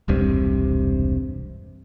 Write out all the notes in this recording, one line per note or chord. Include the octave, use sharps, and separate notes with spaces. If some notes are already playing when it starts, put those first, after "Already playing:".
E1 C2 G2 C3